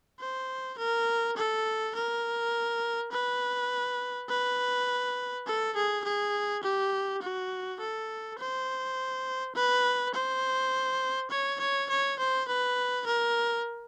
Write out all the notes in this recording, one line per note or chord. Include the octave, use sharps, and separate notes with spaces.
C5
A#4
A4
A#4
B4
B4
A4
G#4
G#4
G4
F#4
A4
C5
B4
C5
C#5
C#5
C#5
C5
B4
A#4